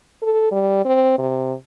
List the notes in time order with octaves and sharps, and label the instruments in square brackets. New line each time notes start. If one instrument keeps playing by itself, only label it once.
[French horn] A4
G3
C4
C3